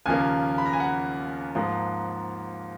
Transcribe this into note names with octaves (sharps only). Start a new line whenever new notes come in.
D#2 C#3 F3 A#3 G#5
B5
A#5
G#5
F#5
G#2 F3 A#3